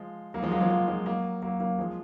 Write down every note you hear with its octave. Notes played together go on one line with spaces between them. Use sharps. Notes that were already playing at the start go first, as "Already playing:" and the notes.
Already playing: F3 G#3
F#3 A#3
F3 G#3
F#3 A#3
F3 G#3
F#3 A#3
F3 G#3
F#3 A#3
F#3 A#3
F#3 A#3
F3 G#3